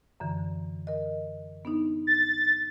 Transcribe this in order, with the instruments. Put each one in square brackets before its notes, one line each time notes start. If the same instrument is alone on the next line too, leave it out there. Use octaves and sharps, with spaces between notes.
[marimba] F#2 D3 E3
A#4 D#5
B3 D4 D#4
[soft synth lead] A6